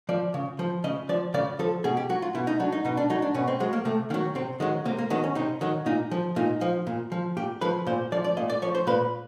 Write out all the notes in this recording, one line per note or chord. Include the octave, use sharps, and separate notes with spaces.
F3 D5
C#3
F3
C#3 D#5
F3 D5
C#3 D5
F3 A4
B2 G#4
G4
F#3 F#4
F4
B2 E4
D#4
F#3 D4
D#4
B2 D#4
D4
F#3 D#4
D4
B2 C#4
C4
F#3 G#3
A#3
C3 A3
D#3 F#3 A#3
C3 C4
D#3 F#3 G#3
C3 A#3
A#3
D#3 F#3 B3
C#4
C3 D#4
D#3 F#3
A#2 D#4
F3
A#2 D#4
F3
A#2
F3
A#2 G4
F3 B4
A#2 C5
F3 D5
D5
A#2 D#5
D5
F3 C#5
C5
A#2 B4